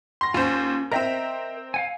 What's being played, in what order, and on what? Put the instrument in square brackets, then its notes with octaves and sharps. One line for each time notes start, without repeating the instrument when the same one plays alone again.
[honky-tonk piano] C6 A#6
[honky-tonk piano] D#2 C5 [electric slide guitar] C#4 F4
[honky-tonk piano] C4 G5 A#5 [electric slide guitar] A#4 D#5 E5
[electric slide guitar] F5 F#5 G#5